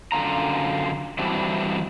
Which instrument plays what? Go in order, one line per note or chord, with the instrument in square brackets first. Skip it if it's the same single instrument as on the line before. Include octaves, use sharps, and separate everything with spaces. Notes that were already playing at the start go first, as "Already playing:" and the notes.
[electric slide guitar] F#2 D3 F4 A#5
E3 G3 C4 D4 E4 F#4